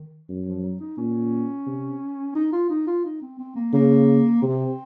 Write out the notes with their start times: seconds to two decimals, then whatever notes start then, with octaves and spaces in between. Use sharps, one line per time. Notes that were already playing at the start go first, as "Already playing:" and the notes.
Already playing: D#3
0.29 F#2
0.46 F3
0.63 F#3
0.80 D#4
0.97 A#2 C#4
1.66 C3
2.35 D#4
2.53 F4
2.70 D#4
2.87 F4
3.05 D#4
3.22 C4
3.39 C4
3.56 A#3
3.73 C#3 A#3
4.42 C3 C4